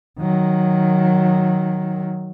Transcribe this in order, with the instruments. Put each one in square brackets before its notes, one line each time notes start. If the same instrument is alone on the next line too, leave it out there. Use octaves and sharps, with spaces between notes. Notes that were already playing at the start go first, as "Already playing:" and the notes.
[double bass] D#3 F#3